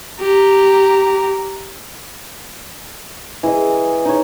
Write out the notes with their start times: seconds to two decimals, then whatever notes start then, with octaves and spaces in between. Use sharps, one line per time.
0.21 G4 A#5
3.43 E3 E4 G#4 D#5
4.05 D#4 C#5